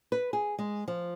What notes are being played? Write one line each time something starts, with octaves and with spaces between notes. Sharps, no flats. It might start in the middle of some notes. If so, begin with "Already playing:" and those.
B4
G#4
G#3
F3